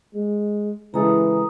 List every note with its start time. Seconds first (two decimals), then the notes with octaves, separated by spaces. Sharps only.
0.15 G#3
0.94 C#3 E3 G#3 A4 A#5 D#6